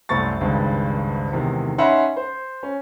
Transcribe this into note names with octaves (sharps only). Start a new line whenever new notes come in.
C2 F#2 A3 C5 C#6 A6
G#1 C#2 G2
E2 G#2 C3 D#3
C#4 D#4 E5 F#5 B5 C6
C5
C#4